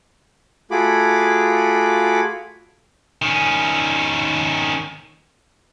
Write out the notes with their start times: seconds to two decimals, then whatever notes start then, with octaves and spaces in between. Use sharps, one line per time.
0.71 A3 F4 F#4 G#4 B5 D6
3.22 D#3 C#4